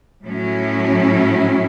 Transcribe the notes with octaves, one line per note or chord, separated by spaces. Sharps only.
A2 F#3 C#4 E4